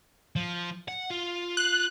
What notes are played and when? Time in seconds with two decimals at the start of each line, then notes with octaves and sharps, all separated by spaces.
0.36 F3
0.88 F#5
1.11 F4
1.57 F#6